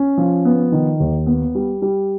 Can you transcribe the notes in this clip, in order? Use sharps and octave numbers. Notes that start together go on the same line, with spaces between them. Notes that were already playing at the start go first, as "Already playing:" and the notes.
Already playing: C#4
F3
B3
D#3
D#2
B3
G3
G3